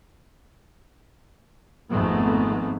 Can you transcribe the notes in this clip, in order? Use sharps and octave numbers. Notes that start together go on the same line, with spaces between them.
G#1 F2 G#2 A3 B3